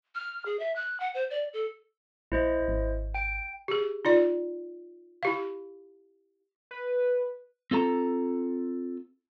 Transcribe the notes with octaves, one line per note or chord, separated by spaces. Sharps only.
F6
G#4
E5
F#6
F#5
C5
D5
A4
A#1 E4 C5 D#5
G#1
G5 D7
G4 G#4
D#4 F4 D5
E4 G4 F5
B4
C4 F4 A4 A#5